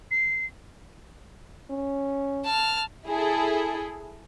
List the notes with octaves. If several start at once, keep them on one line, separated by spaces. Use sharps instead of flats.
C7
C#4
A5 F6
E4 G#4 A4